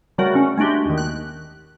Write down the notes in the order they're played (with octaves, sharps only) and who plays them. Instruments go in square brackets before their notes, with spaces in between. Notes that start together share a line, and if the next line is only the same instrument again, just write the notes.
[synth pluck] C#3 F#3 G3 A3 F#4 A#4
C#4
G#3 A3 D4 F#4 G4
D#2 D#3
F#6